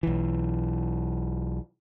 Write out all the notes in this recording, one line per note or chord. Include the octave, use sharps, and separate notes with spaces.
B1 E3